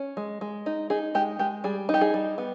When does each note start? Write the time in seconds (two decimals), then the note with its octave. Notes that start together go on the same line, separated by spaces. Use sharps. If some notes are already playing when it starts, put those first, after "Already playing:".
Already playing: C#4
0.17 G#3
0.41 G#3
0.66 D#4
0.90 D#4 G#4
1.15 G#3 G4
1.39 G#3 G4
1.64 G3 G#4
1.89 D#4
1.94 G4
2.01 G#4
2.14 G3
2.38 B3